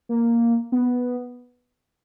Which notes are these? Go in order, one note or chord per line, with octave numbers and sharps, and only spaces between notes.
A#3
B3